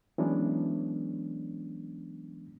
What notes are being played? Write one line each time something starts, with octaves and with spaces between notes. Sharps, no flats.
E3 F#3 G#3 B3 C#4 D4